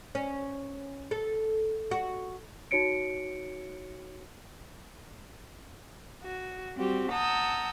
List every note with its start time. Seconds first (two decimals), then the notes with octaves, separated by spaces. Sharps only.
0.15 C#4
1.11 A4
1.91 F#4
2.71 D#4 F#4 C#5 C#7 D7
6.23 F#4
6.75 G3 C4 F#4 G4
7.11 F#5 A5 A#5 D#6 E6 G6